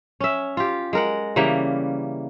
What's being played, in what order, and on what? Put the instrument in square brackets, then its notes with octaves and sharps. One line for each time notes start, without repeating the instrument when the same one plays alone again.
[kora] C#4 E5
F4 G4
G#3 A#4 F#5
C#3 E3 G3 A#3